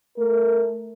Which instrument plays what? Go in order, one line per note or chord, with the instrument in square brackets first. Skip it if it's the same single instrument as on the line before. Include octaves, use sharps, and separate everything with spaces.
[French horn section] A3 A#4